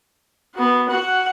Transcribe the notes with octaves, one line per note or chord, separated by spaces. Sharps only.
B3 F#4
F#4 F#5